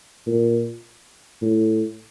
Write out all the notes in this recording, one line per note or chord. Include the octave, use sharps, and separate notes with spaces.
A#2
A2